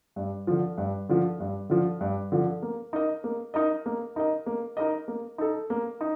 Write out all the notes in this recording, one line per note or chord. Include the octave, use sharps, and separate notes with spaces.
G2
D3 F3
G2
D3 F3
G2
D3 F3
G2
D3 F3
A#3
D#4 A#4 D#5
A#3
D#4 A#4 D#5
A#3
D#4 A#4 D#5
A#3
D#4 A#4 D#5
A#3
D#4 A4
A#3
D#4